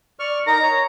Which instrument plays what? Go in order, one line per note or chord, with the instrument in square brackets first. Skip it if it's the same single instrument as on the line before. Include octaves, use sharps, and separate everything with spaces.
[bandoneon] D5 C#6 F6
[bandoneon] D#4 A#4 [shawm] A#5
[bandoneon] C#5